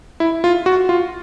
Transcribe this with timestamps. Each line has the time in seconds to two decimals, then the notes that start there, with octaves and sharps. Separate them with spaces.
0.20 E4
0.44 F4
0.66 F#4
0.89 F4